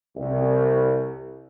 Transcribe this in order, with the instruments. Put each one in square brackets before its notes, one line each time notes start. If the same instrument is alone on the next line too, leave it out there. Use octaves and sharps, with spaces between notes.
[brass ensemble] C2